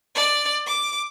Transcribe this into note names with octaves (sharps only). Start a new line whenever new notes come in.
D5
D6